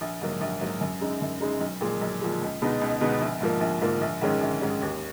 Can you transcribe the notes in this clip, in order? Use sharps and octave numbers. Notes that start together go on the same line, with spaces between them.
A#1
G#2 F#3 A#3
A#1
G#2 F#3 A#3
F#2
C#3 G#3 D#4
F#2
C#3 G#3 D#4
B1
A#2 F3 G#3
B1
A#2 F3 G#3
C#2
B2 G#3 B3 D#4
C#2
B2 G#3 B3 D#4
A#1
G#2 F3 A#3
A#1
G#2 F3 A#3
A#1
G#2 D#3 G#3 C#4
A#1
G#2 D#3 G#3 C#4
D#2